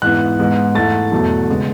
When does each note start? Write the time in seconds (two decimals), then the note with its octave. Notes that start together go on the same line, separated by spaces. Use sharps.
0.02 G#2 E3 B3 F#6
0.39 G#2 G#3 B3
0.75 G#2 E3 A3 A6
1.12 E2 B2 F#3 A3
1.50 C#3 G#3 B3